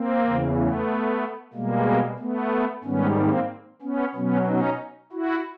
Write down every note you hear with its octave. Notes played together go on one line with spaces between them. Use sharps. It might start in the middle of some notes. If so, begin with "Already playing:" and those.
Already playing: A#3 C4
E2 C#3 E3
A3 B3
B2 G3 G#3 A#3
A3 B3
G#2 D#3 G3 B3 C#4
A#3 C4
B3 C#4
B2 F#3 B3 C#4
C#4 D#4
E4 F#4